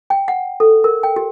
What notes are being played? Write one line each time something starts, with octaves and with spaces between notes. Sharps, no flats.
G5
F#5
A4
A#4
G5
G4